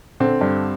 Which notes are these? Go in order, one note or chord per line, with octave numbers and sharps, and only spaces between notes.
D3 C4
G2